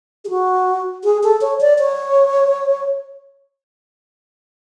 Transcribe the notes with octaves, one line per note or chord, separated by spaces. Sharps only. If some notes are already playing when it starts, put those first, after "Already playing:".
G#4
F#4
G#4
A4
C#5
D5
C#5